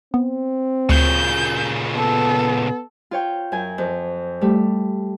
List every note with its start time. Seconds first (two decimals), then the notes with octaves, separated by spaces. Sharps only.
0.14 B3 C4
0.89 D2 A#2 C#3 G6
1.96 B3 A4
3.11 F4 C#5 G5
3.52 F#2 G#5
3.78 F2
4.41 G3 A3